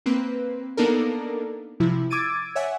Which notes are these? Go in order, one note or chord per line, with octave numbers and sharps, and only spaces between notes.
A#3 C4 B4
A#3 B3 D4 D#4 A4 A#4
C3 F3 E4
D6 E6 G#6 A6 D7 D#7
C#5 E5 F#5 G#5